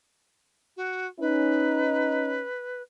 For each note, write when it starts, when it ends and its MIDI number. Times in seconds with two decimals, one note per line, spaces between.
0.76 1.07 66
1.20 2.43 61
1.20 2.43 63
1.20 2.82 71